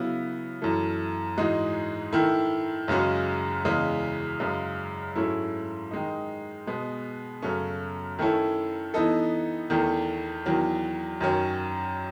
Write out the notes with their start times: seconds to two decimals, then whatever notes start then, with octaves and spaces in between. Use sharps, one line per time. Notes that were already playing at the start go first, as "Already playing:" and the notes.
Already playing: C#3 F#3 B3 E4
0.62 F#2 E3 A3
1.37 G#2 E3 G#3 D#4 F#4
2.13 D#3 A3 E4
2.88 F#2 C#3 G#3 C#4 F#4
3.65 E2 C#3 E3 G#3
4.40 F#2 C#3 G#3
5.16 G#2 F#3 A3 C#4 E4
5.91 D#3 G#3 D#4
6.66 B2 G#3 B3
7.42 F#2 C#3 F#3 A3 C#4
8.19 D#3 A3 C#4 E4 A4
8.94 E3 B3 D#4 A4
9.70 E2 D#3 A3
10.46 E2 D#3 F#3
11.21 F#2 D#3 F#3 C#4